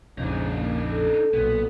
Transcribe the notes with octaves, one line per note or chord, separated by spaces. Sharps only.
A#1 F2 G#2 C#3 D4 D#4
A#3
A4
B1 A#2 B3